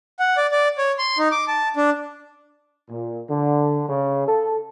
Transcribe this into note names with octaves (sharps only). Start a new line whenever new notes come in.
F#5
D5
D5
C#5
C6
D#4
D6
A5
D4
A#2
D3
C#3
A4